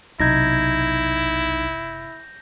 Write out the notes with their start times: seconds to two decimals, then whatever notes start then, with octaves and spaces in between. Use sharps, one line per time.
0.20 F#1 B1 C3 D#4 E4 G6 G#6 A#6